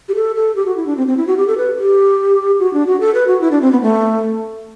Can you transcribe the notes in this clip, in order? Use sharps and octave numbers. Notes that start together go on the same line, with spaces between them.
G4
A4
A4
G4
F#4
E4
D4
C4
C4
E4
F#4
G4
A4
B4
G4
F#4
D4
F#4
A4
B4
F#4
E4
D4
C4
B3
A3